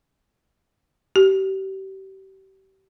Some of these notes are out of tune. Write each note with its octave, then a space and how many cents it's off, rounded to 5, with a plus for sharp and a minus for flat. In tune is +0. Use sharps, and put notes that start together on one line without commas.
G4 -35